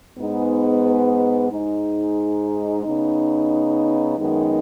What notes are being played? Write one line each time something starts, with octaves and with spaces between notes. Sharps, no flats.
G#2 G#3 B3 D#4
G#2 G#3 D#4
C#3 B3 D#4
F#2 D#3 G#3 B3 D#4